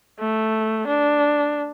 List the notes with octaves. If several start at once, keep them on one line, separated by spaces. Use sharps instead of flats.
A3
D4